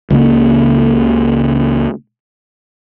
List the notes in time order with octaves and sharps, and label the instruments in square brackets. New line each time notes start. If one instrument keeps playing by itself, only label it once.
[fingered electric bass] C#2 C#3 A#3